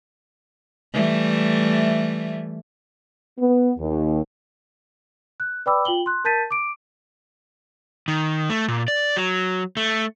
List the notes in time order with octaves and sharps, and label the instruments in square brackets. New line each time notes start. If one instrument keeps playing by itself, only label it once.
[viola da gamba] E3 G3 A3
[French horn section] B3
D#2
[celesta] F#6
B4 D5 G5 B5 D6 E6
F4 G5 F#7 G7
C6 F#6
A#4 A5 G6 A6 B6 D#7
D6 D7
[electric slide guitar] D#3
A3
A#2
D5
F#3
A3